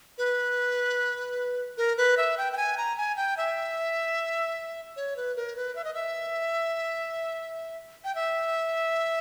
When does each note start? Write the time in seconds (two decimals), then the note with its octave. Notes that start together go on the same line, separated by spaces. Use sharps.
0.18 B4
1.78 A#4
1.97 B4
2.17 E5
2.38 G5
2.53 G5
2.57 G#5
2.78 A#5
2.97 G#5
3.17 G5
3.37 E5
4.96 C#5
5.16 B4
5.36 A#4
5.56 B4
5.76 E5
5.84 D#5
5.94 E5
8.04 G5
8.15 E5